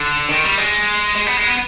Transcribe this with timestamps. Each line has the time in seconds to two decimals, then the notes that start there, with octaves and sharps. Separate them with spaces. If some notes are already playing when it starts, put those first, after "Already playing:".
Already playing: D3
0.29 D#3
0.44 G3
0.58 G#3
1.15 G#3
1.26 B3
1.37 G#3
1.47 B3